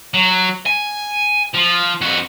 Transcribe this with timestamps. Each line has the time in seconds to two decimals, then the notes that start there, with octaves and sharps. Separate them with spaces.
0.14 F#3
0.66 G#5
1.55 F3
2.01 F2 F#4